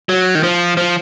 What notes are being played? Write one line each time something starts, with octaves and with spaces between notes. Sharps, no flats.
F#3
D#3
F3
F3